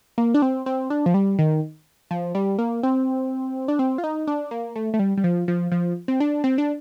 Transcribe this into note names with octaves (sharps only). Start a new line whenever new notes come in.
A#3
D4
C4
C4
D4
F3
G3
D#3
F3
G3
A#3
C4
D4
C4
F4
D#4
D4
A#3
A3
A3
G3
G3
F3
F3
F3
C4
D4
C4
D4